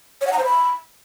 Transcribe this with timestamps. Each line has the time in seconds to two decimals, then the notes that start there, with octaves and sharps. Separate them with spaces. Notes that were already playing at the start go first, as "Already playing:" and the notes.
0.21 C#5
0.27 F#5
0.33 A#5
0.39 C5
0.44 B5